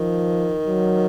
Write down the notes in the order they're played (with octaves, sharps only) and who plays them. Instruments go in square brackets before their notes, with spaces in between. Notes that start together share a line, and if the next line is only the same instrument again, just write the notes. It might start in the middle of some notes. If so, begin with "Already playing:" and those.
Already playing: [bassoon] D#3 [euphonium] F3
[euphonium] F#3